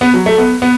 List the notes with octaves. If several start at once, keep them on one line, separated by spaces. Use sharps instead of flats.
B3
F#3
A3
B3
B3